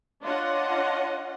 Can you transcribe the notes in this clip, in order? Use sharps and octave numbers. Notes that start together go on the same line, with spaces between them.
D4 F4 C#5 D#5 F#5